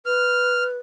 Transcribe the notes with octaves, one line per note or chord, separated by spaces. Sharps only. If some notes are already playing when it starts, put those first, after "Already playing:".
B4 F6